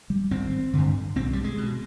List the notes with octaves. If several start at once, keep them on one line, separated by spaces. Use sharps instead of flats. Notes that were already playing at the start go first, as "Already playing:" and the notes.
G3
G#1 C4
G2 D3
B1 C4
G3
G#3
B2